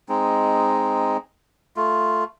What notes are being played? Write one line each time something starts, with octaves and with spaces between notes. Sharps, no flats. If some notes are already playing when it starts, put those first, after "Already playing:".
G#3 C4 D#4
A3 F4